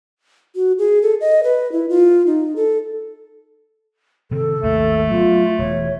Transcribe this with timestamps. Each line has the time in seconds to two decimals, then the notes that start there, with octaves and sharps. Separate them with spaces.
0.56 F#4
0.79 G#4
1.02 A4
1.21 D#5
1.44 B4
1.72 E4
1.89 F4
2.27 D#4
2.56 A4
4.31 C3 D#3 C4 A4
4.63 G#1 D#2 A3
5.10 F#3 B3 F4
5.59 E1 E3 C#5